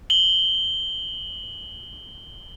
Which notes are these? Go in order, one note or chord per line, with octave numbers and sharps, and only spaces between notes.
F#7 G7